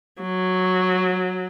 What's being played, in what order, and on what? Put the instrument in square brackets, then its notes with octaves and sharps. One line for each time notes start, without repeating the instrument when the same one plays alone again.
[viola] F#3